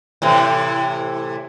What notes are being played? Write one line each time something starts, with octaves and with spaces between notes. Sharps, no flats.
A2 C3 E3